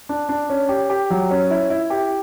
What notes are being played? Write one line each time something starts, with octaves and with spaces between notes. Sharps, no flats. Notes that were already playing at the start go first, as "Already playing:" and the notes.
D4
D4
C#4
G4
G4
F#3
C#4
E4
E4
G4